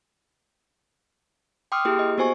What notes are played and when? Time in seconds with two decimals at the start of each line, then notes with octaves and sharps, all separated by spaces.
1.72 G5 C6 D6 D#6 F6
1.85 A#3 E4 G4 G#4
1.99 D#5
2.18 B3 F#4 C5 G#5 C#6